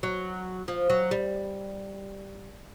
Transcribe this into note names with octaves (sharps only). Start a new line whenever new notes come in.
F#3
F3
F#3
G3